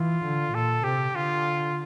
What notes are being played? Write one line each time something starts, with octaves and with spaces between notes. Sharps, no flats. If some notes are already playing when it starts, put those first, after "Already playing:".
Already playing: E3 F4
D3
A#2 A4
C3 G4
D3 F4